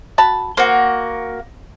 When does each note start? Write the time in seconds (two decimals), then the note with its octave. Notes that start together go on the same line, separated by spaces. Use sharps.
0.18 F#4 A5 B5
0.57 A#3 F#4 C5